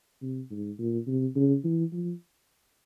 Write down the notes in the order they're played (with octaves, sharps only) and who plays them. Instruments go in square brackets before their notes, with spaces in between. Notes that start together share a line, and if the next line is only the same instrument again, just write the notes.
[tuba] C3
G#2
A#2
C3
C#3
E3
F3